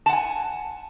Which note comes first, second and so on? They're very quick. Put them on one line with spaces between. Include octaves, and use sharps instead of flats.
A5 F#5 G#5